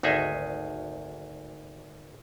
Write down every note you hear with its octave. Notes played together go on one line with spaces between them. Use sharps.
G#1 D2 D#4 G#4 E5